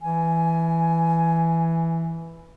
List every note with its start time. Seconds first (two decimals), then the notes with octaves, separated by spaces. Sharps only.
0.02 E3 G#5